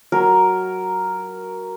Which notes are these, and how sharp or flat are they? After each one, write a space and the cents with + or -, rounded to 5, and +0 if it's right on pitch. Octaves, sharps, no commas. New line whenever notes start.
F#3 +5 A#4 +0